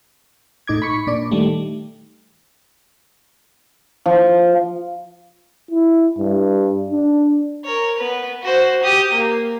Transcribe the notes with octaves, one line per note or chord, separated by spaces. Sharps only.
A2 D#4 D6 G#6
B5 C#6
A#2 D4 D5
D#3 G3 A3
F3
E4
G2
D4
A#4 C#5
B3 B4
F#4 C5
G4 D#6
A#3